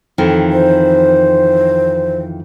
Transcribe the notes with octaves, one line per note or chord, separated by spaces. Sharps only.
F2 D#3 E3
C5